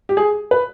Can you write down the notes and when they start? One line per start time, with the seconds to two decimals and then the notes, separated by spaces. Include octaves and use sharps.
0.09 G4
0.17 G#4
0.51 B4